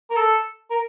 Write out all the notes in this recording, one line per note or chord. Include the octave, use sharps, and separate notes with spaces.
A#4
A4
A#4